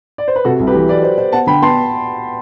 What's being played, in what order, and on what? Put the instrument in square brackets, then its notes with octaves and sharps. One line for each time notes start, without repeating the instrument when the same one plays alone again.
[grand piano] D5
C5
B4
[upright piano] C3 [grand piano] F#4 A4
[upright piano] C2
[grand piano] G4 B4
[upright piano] E3
[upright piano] F#3 [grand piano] B4 D5
[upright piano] C5
C5
[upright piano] B3 [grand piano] F#5 A5
[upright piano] D3 [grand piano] G5 B5
[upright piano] B3 [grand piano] A5 C6